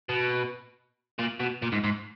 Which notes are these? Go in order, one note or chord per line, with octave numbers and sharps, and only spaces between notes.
B2
A#2
B2
A#2
G#2
G#2